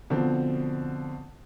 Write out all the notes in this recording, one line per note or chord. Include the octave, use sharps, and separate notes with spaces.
B2 D3 F3 C4